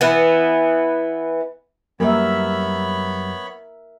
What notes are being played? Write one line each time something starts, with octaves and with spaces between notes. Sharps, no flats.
E3 B3
F#2 G3 A#3 B3 A#4 C#5 E5 B5